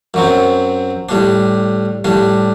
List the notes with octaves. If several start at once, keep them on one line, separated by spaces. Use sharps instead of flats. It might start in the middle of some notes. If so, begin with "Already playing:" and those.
F#2 F#3 C4
A2 G3 D4
A2 G3 D4